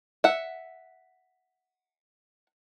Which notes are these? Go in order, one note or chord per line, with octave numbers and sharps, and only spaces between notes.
E5 F#5